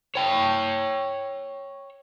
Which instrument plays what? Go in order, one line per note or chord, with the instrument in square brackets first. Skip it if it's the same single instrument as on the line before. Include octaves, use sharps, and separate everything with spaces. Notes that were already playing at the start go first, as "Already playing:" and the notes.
[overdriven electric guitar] C#5 G5